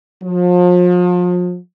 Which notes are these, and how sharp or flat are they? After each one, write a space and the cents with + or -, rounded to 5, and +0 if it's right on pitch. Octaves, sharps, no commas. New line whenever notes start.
F3 +35